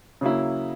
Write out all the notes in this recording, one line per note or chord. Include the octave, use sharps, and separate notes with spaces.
C#3 F#3 A#3 E4